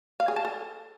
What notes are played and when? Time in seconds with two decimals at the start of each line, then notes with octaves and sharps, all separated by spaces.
0.20 F5
0.28 G#4
0.36 A5
0.45 A4